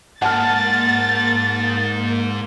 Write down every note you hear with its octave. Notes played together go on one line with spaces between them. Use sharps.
G#2 A#3 F#5 A5 F6 A6